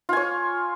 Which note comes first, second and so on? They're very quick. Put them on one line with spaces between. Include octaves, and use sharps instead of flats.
F4 G#5 C#5